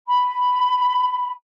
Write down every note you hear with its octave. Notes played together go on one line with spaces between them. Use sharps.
B5